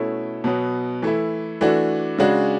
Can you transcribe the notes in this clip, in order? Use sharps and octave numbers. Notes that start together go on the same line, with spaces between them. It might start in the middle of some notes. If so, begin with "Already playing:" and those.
Already playing: B2 A3 C#4 E4
B2 F#3 B3
E3 A3 E4
E3 A3 D4 F#4
C#3 G#3 D4 F#4